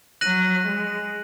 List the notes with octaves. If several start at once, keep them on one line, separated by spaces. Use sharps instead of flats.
F#3 F#6 A#6 D#7 F#7
G#3